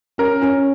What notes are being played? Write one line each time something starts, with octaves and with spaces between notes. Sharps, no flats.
C#4 A#4
C#4